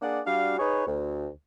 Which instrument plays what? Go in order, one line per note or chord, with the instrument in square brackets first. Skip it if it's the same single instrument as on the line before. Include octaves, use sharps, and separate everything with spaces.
[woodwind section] A#3 D4 G#4 D5 F#5
G3 D4 F#4 F5
D#4 G#4 B4 C#5
D2